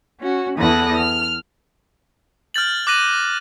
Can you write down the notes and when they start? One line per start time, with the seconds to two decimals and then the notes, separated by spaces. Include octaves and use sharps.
0.20 C#4 F#4
0.58 E2 E3 A4 D#6 F#6 A#6
0.96 F6
2.54 F6 G6 A6 F#7
2.87 D6 F#6 A#6 D#7 F#7